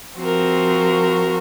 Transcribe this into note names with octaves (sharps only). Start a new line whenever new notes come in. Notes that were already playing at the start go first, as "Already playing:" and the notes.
F3 C4 F#4 A#4